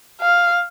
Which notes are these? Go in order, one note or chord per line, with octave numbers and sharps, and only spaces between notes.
F5